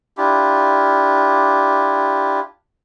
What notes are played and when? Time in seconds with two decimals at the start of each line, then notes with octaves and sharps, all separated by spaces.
0.17 D4 E4 F4 G4